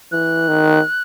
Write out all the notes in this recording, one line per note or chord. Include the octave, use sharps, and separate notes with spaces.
E3 F#6
D#3